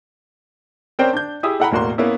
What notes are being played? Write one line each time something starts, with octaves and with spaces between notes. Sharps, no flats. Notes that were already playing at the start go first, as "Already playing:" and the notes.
C4 C#4 A#4 C5 D5 G5
D4 G6
E4 G4 G#4 D#6 E6
E4 A4 F#5 G5 A#5 B5
E1 A2 A#3 F#4 A#5 C6
A#3 B3 C#4 E4